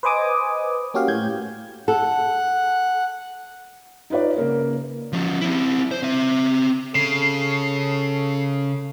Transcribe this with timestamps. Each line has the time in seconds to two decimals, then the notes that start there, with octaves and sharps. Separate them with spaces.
0.03 B4 C5 D#5 G#5 D6 D#6
0.94 A#3 C#4 F#4 G4 F5
1.08 A2 G6 G#6
1.88 A4 F#5
4.10 D#4 F4 B4 C#5 D5
4.37 C#3 A#3 A#4
5.13 F3 C#4
5.41 C4 E4
5.91 C5
6.03 C4 E5
6.95 C#3 A4 C7